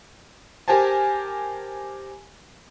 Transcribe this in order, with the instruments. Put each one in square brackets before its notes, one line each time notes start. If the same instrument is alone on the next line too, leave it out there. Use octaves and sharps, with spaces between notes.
[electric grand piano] G4 A#4 C5 G#5 A5